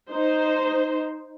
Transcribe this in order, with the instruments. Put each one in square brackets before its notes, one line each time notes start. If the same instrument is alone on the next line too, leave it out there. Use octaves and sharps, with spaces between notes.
[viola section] D#4 C5